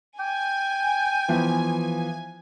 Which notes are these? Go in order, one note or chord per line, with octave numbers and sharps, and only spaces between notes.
G5 G#5
E3 F3 B3